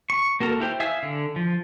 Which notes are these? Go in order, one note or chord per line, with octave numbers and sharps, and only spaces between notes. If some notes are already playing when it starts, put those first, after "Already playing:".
C#6
A#3 F#4 A4 A#4
E4 G4 C5
E5 F5 G#5 D#6 E6
D3
F3